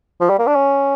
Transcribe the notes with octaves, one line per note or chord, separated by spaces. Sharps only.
F3
G3
A#3
D4
C#4